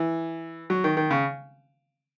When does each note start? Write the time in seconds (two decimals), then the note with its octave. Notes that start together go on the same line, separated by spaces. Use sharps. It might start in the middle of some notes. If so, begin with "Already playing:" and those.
Already playing: E3
0.70 F#3
0.84 D#3
0.97 D#3
1.10 C#3